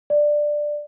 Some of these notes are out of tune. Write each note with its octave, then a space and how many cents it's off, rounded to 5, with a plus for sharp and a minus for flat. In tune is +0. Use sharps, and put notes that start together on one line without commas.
D5 +10